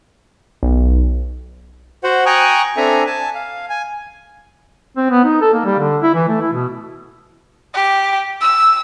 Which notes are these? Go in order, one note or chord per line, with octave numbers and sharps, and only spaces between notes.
B1
F#4 C5 F#5
G5 G#5 A#5 C#6 D#6 F#6
C4 D4 A4 E5 G#5 A#5
G#5 A5
F5
G#5
C4
B3
D#4
A4
A#3
G3
D3
E4
E3
A3
E4
B2
G4
E6